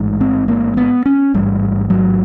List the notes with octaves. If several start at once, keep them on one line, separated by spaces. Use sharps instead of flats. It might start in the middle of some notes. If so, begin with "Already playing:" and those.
Already playing: A1 G#2
C4
A#3
B3
C#4
A1 G#2 G3
F#3